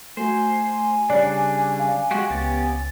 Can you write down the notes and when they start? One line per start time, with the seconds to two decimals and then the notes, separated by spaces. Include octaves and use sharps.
0.17 A3 F#4 C5 G#5
1.10 C#3 G3 D4 C#5 D5 D6 F#6
1.79 F5
2.11 G#3 F#4 G4 F#6
2.30 C#2 B3 C#4 G4 A6